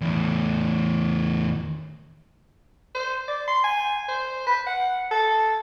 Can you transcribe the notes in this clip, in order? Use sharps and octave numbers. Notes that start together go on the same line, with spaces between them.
E2 A2
C5
D5
C6
G#5
C5
B4
F#5
A4